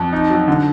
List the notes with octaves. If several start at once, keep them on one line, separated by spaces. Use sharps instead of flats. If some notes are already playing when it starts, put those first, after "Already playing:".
Already playing: F2
D#4
F#3
D3